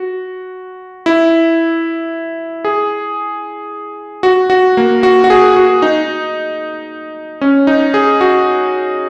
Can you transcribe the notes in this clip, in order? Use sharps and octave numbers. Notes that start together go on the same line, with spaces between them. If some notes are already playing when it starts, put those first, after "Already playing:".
Already playing: F#4
E4
G#4
F#4
F#4
A#3
F#4
F#4
G#4
F#4
D#4
C#4
D#4
G#4
F#4